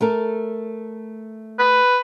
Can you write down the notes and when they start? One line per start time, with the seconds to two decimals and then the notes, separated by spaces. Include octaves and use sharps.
0.01 A3 A4 A#4
1.59 B4